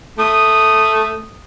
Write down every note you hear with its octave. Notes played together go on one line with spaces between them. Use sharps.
A3 D#6